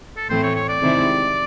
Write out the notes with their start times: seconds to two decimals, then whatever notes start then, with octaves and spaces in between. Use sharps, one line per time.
0.17 A4
0.30 A2 E3 A3 C4 C5
0.43 C#5
0.55 C#5
0.69 D5
0.82 C3 D#3 G#3 C4 E4